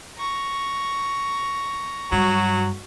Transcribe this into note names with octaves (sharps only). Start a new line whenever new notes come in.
A#5 C#6
G2 F#3 F#4